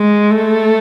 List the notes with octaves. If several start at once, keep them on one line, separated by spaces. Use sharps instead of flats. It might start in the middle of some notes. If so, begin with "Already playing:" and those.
Already playing: G#3
A3